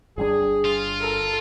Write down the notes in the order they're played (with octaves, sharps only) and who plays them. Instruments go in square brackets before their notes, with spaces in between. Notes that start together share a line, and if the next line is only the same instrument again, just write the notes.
[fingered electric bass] G1 G3 D4 [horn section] G#4
[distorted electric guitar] F4
[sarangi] A4 [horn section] A#4